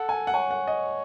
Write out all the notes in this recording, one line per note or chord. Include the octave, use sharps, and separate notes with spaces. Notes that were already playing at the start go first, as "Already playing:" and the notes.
Already playing: A4 F#5
G#5
F#5
C#5 G#5
F#5
D#5